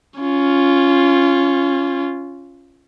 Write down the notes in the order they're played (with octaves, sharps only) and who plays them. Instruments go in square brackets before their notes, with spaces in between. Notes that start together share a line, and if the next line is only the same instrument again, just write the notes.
[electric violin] C#4 F4